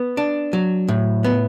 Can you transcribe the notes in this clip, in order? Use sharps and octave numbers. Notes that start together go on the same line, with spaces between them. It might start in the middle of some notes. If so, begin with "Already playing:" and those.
Already playing: B3
D4
F#3
A2
B3